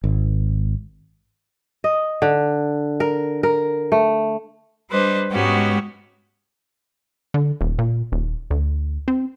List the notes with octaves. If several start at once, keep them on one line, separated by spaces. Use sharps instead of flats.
G#1
D#5
D3
A#4
A#4
A3
G3 D4 B4 C5 D#5
G#2 G#3 B3 C#4 F#4 G4
D3
D#1
A#2
D#1
D2
C4